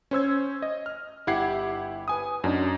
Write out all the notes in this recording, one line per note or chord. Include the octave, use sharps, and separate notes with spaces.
C#4 C5 E6 G#6
D#5
F6
G1 E4 G4 F#5 G#6 C7
B4 G#5 D#6
F#2 D4 D#4